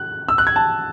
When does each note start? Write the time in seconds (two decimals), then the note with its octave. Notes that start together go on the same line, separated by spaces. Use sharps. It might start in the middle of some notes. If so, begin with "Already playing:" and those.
Already playing: F#6
0.29 E6
0.38 F#6
0.47 G#6
0.56 A5